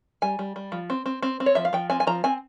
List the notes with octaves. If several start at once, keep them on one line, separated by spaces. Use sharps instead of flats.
G3 G#5
G3
G3
F3
C4
C4
C4
C4
C#5
F3 E5
F5
F3 G5
C4 G#5
G#5
F3 A#5
C4 G#5